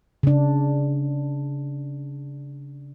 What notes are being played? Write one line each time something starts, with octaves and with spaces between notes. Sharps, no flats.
C#3 D4